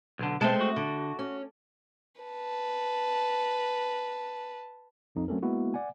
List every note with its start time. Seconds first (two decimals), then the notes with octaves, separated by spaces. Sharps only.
0.19 B1 D3
0.41 B2 G#3 A3 C4 A5
0.61 F#4
0.76 D3
1.19 C#4
2.21 B4 A5
5.15 A#1 F2 D#4
5.28 F#3 A3 C4 C#4 A4 A#4
5.42 G#3 A#3 B3 E4 F#4
5.74 D5 F#5 G#5